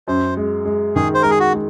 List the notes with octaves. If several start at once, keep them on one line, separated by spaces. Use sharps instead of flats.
F#2 C5
G#3
G#3
D#3 G#4
C5
G#3 A#4
G#4
F#4
G#3